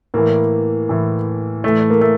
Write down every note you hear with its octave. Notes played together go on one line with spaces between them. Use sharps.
A2 E3 A#3
A2 E3
A2 E3 A3
A#3
A3